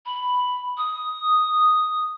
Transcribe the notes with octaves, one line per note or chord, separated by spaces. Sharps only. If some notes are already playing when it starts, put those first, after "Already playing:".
B5
D#6